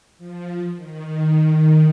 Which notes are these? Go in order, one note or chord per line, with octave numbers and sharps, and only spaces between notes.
F3
D#3